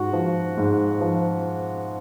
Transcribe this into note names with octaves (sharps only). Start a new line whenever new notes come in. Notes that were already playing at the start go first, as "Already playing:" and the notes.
Already playing: G#2 F#4
F3
G#2
F3